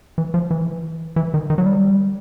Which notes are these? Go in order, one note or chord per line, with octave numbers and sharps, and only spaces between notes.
E3
F3
E3
E3
D#3
D#3
F#3
G3